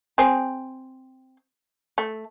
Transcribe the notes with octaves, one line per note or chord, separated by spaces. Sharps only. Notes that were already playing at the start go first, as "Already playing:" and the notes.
C4 G#4
A3